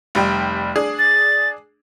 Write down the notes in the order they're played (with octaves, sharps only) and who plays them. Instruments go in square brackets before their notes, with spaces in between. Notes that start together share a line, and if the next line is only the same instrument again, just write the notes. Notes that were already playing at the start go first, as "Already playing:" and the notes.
[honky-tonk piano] F1 G3 G5
D4 G#4
[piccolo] A6